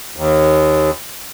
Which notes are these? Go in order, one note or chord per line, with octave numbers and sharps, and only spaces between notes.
D#2